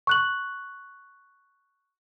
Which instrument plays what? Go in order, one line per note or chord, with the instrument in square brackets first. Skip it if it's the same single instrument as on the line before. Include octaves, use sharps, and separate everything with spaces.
[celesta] C#6 F#6 F#7